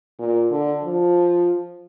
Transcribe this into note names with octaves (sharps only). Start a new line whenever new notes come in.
A#2
D3
F3